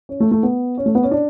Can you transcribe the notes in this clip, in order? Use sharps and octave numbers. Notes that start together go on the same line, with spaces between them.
C#4
A3
A3
B3
C#4
A3
B3
C#4
D4